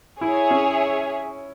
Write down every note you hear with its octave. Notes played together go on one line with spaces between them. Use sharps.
E4 G#4 C#5 E5
C#4